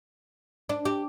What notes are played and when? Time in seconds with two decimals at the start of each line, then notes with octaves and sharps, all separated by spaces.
0.69 D4
0.85 G4